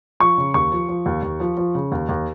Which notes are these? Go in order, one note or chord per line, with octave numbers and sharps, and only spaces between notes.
F3 C#6
C#3
D#2 C#6
F3
F3
D#2
D#2
F3
F3
C#3
D#2
D#2